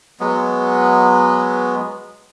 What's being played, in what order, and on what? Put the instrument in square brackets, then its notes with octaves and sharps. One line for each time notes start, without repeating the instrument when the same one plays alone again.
[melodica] F#3 G#3 B3